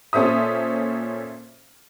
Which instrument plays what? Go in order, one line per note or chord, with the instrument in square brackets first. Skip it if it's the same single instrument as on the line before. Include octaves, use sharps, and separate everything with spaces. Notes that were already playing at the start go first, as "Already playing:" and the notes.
[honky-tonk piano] A#2 C#4 A4 C5 E5 D#6